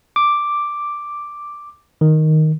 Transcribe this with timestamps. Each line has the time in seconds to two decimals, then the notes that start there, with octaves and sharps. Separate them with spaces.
0.16 D6
2.01 D#3